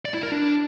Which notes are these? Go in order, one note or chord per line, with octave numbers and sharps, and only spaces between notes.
D5
E4
A#4
D4